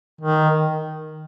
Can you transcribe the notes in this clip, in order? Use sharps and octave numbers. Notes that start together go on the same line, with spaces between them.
D#3